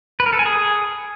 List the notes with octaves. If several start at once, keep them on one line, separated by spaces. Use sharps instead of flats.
B4
A#4
A4
G#5
G#4